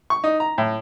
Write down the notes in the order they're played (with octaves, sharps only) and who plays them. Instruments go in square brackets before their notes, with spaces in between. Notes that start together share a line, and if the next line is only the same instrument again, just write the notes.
[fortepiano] C#6
D#4
A#5
A2